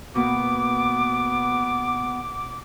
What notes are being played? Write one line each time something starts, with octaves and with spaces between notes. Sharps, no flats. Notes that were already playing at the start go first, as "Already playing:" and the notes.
B2 A#3 B3 D6